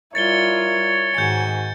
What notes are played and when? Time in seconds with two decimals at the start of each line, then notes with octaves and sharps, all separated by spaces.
0.15 G3 E4 F4 A#4 C#5 A6 C#7 G7
1.14 G#2 D#3 F#4 G#5 G6 C#7